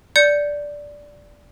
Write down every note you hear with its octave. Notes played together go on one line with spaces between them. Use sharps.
D5 G6 C#7